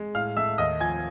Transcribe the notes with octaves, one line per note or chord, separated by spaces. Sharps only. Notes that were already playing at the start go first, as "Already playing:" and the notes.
Already playing: G#3
A2 F5 F6
A3 E5 E6
D#2 D#5 D#6
F3 G#5 G#6